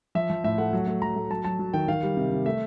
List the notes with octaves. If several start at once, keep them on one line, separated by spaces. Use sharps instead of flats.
F3 E5
F3
A2 E5
A3 F#5
F#3
A3
F#3 A#5
A3
F#3 A5
F#3 A5
F#3
D#3 G5
D#3 F5
G3
C3
C3
A3 E5